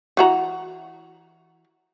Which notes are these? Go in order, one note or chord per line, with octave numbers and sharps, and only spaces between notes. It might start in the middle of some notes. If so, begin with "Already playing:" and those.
E3 F#4 A#5